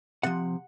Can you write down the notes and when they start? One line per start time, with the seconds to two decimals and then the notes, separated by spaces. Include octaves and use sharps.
0.23 C3 F3 F#5